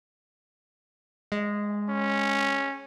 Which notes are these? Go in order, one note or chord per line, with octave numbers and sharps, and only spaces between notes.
G#3
C#4